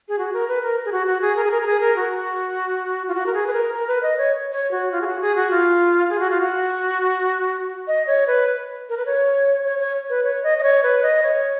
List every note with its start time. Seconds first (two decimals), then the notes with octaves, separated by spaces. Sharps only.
0.09 G#4
0.19 F#4
0.33 A#4
0.48 B4
0.63 A#4
0.85 G#4
0.92 F#4
1.07 F#4
1.22 G#4
1.36 A#4
1.44 G#4
1.51 A#4
1.62 A#4
1.66 G#4
1.81 A#4
1.96 F#4
3.08 F4
3.14 F#4
3.26 A#4
3.34 G#4
3.47 B4
3.53 A#4
3.73 A#4
3.88 B4
4.03 D#5
4.18 C#5
4.52 C#5
4.71 F#4
4.92 F4
5.01 G#4
5.06 F#4
5.21 G#4
5.36 F#4
5.51 F4
6.10 G#4
6.20 F#4
6.30 F4
6.41 F#4
7.87 D#5
8.07 C#5
8.27 B4
8.89 A#4
8.97 B4
9.06 C#5
9.65 C#5
9.79 C#5
10.10 B4
10.24 C#5
10.44 D#5
10.59 D#5
10.63 C#5
10.83 B4
11.03 D#5
11.23 C#5